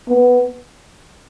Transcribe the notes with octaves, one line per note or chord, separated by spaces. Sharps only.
B3